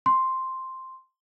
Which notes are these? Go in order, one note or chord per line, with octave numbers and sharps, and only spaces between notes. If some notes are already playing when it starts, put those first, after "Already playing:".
C6